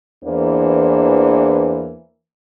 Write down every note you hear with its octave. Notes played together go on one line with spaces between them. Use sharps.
E2 E3 A#3 D4 C5